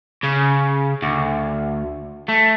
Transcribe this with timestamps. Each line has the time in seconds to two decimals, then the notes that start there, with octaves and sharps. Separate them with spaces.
0.24 C#3
1.03 D2
2.29 A3